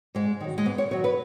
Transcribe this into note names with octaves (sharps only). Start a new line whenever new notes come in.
G#2 G#3
D#3 F#3
G#3
G#2 B3
C#5
D#3 F#3 C#5
B4